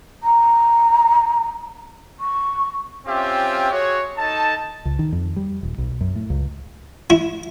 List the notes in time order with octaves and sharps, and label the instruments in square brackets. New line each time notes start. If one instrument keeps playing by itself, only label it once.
[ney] A#5
C#6
[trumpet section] C4 C#4 F4 G4 E5
F#4 G#4 C#5
D#4 A4 A5
[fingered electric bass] C#2
D#3
F2
G3
D#1
B1
F#2
A2
C#2
[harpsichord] E4